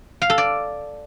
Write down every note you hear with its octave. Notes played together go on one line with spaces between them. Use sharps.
F5
A4
D5